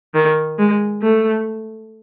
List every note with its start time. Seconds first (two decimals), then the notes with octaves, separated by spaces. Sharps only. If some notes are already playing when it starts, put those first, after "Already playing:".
0.14 D#3
0.59 G#3
1.02 A3